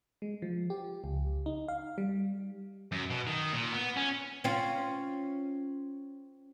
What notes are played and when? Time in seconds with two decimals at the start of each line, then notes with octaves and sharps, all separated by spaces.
0.22 G#3
0.42 F3
0.70 G4
1.04 C#2
1.46 D#4
1.68 F5
1.98 G3
2.92 F#2
3.10 B2
3.27 D#3
3.53 A#2
3.73 B3
3.96 C#4
4.44 C4 C#4 F4